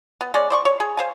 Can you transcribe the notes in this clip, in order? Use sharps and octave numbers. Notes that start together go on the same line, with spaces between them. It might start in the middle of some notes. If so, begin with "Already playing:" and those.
B3
G#3 C#4 D5
C5 D5 C#6
C#5
G#4
C5 F5 G#5